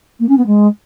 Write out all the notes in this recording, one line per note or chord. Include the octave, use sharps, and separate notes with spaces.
A#3
C#4
B3
G#3